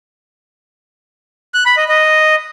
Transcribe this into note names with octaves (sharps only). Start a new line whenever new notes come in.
F#6
B5
D#5
D#5